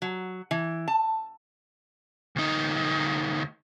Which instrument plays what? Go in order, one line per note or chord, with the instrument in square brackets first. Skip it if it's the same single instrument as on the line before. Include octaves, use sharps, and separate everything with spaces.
[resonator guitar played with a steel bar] F#3
E3
A5
[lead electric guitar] D2 D#4